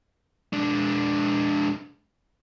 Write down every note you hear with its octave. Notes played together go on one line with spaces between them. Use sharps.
G#3 D4